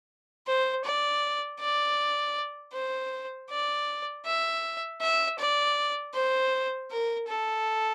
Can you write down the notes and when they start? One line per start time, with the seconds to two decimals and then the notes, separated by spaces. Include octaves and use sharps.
0.47 C5
0.85 D5
1.60 D5
2.73 C5
3.50 D5
4.26 E5
5.01 E5
5.39 D5
6.14 C5
6.91 A#4
7.28 A4